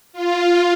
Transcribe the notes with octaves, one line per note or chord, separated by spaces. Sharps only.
F4